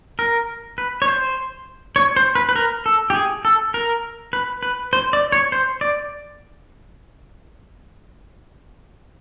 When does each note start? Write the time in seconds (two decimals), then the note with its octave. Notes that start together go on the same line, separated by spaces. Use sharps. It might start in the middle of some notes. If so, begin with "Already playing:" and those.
0.19 A#4
0.78 B4
1.02 C#5
1.08 C5
1.96 C#5
2.16 C5
2.35 B4
2.49 B4
2.56 A#4
2.86 A4
3.10 G4
3.15 G#4
3.45 A4
3.74 A#4
4.33 B4
4.63 B4
4.93 C5
5.13 D5
5.32 C#5
5.52 C5
5.81 D5